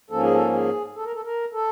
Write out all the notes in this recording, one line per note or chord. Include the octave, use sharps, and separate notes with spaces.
G#2 F3 A#3 C#4 A4
G#4
A4
G#4
A4
A#4
A4
A#4
A4